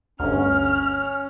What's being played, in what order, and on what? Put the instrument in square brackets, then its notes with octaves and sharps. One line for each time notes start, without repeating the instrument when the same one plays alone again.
[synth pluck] G1 D2 [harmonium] C#4 [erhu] F6